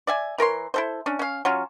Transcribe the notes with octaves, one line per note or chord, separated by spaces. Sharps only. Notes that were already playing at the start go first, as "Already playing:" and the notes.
D5 E5 G#5
E3 A#4 C#5 C6
E4 A4 C5
C#4 D4
C#4 F5
F#3 C#4 F4